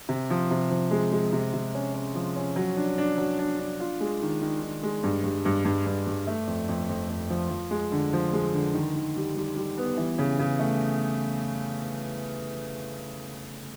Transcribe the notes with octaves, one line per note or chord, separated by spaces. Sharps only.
C3
F3
C3
F3
G#3
G#3
C3
C3
C#4
C#4
F3
C#4
F#3
D4
D4
F#3
D4
D4
F4
G#3
D#3
D#3
D#3
G#3
G2
G2
G2
G2
G2
G2
A3
F2
F2
F2
F2
F3
F3
G#3
D3
F3
G#3
D3
D#3
D#3
G3
G3
G3
B3
E3
C#3
C#3
A3